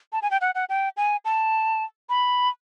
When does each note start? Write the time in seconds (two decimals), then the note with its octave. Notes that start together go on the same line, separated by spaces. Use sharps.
0.13 A5
0.22 G#5
0.31 G5
0.41 F#5
0.55 F#5
0.69 G5
0.97 G#5
1.25 A5
2.09 B5